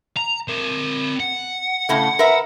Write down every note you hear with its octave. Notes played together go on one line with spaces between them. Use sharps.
A#5
C4 A#4
F#5
A2 C#3 A3
A#4 B4 E5